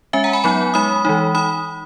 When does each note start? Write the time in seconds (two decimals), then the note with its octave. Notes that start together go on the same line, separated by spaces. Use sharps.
0.13 G#3 C#4 E5 G#5
0.24 F#5 A#5
0.33 G#5 B5
0.44 F#3 B3 D#4 G#5 B5
0.74 G#3 D#4 B5 D#6
1.05 E3 G#3 D#4
1.35 D#4 B5 D#6